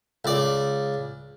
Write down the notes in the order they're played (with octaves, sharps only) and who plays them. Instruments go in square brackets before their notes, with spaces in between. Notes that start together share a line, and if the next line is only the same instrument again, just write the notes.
[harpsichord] C#2 D5